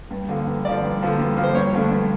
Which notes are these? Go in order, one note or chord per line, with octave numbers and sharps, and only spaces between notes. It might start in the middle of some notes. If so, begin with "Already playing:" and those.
G2
D3 F3 A#3
G2
D3 F3 A#3 D5
G2
D3 F3 A#3
G2
D3 F3 A#3
C5
G2 C#5
D3 F3 A3 D4
G2